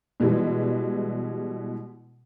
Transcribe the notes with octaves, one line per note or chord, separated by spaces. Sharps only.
B2 E3 G3 G#3